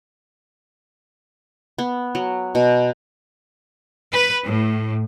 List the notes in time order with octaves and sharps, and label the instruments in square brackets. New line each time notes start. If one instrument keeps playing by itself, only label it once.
[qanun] B3
F#3
B2
[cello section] B4
A2